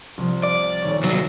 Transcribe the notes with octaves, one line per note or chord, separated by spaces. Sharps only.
C2 F3
D5 F5
D#1 D#3 C#5
C2 F#3